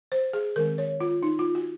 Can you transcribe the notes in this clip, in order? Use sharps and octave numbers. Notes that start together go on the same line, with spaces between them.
C5
G#4
D#3 G#3 C4 A#4
C#5
F4
D#4
F4
F#4